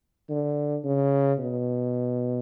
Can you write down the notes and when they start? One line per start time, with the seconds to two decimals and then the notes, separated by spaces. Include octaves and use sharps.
0.30 D3
0.84 C#3
1.38 B2